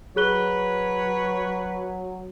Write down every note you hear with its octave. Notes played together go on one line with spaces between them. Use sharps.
F#3 G#4 B4 C#5 F#6 G7